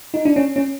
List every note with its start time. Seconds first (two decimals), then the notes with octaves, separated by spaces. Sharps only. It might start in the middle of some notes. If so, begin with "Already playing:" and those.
0.14 D#4
0.25 D4
0.36 C#4
0.56 C#4